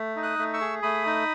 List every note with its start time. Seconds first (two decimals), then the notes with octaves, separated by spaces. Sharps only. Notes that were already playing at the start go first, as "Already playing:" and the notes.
Already playing: A3
0.16 D#4
0.23 D#6 F#6
0.39 A3
0.54 C#6 E6
0.61 G#4
0.83 A3 B5 D#6
1.06 D#4